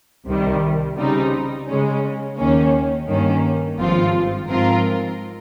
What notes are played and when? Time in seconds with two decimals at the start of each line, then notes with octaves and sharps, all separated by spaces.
0.26 C2 C3 D#3 G3
0.97 C#3 G3 C4 D#4
1.67 C#3 G#3 C#4
2.38 D#2 D#3 A#3 C#4
3.08 G2 D#3 A#3 C#4
3.79 G#1 G2 F3 C4 F4
4.49 G#2 F3 C4 F4 A#4